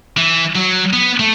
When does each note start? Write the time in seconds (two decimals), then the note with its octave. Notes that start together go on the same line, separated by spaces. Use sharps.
0.17 E3
0.55 F#3
0.93 B3
1.19 A3